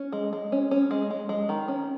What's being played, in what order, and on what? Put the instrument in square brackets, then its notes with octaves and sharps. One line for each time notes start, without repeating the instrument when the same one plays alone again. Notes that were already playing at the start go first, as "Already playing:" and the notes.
Already playing: [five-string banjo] C#4
G#3
G#3
C#4
C#4
G#3
G#3
G#3
D#3
C#4